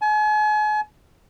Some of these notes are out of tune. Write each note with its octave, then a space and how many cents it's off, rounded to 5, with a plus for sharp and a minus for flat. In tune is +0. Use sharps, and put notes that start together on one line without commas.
G#5 +40